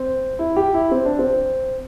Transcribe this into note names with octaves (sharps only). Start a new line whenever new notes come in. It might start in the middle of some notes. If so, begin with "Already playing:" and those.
Already playing: C4
E4
G4
E4
C4
D4
C4